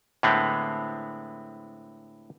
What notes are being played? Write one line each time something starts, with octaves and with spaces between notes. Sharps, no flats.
A2 D3 G#3 B3 C4